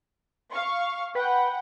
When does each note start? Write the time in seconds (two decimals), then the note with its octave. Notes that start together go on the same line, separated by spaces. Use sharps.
0.52 F5 C#6
1.15 B4 F#5 G5